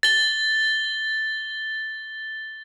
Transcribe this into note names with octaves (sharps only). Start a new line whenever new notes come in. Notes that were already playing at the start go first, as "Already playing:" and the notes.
A6 G7